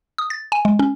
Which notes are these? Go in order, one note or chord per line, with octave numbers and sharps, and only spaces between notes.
D#6
A6
G#5
G#3
C#4